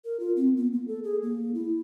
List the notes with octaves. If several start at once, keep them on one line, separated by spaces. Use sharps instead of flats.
A#4
F4
C4
B3
A#3
A4
G#4
A#3
E4